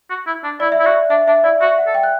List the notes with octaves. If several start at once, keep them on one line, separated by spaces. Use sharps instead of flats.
F#4
E4
D4
E4 D5
E5
E4
F#4 D5
D4 E5
D4 E5
E4 D5
F#4 E5
F#5
A4
G5
F#6